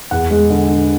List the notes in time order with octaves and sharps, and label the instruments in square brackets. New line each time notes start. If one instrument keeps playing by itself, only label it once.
[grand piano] E2 F#5
G#3
D3
D3